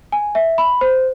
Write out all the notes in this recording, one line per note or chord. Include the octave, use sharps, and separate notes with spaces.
G#5
E5
B5
C5